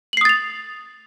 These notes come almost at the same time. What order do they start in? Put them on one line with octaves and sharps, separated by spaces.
F#7 C7 D#6 A6 F7